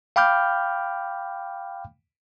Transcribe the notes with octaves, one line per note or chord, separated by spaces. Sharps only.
F5 G5 B5 D6 F6 G6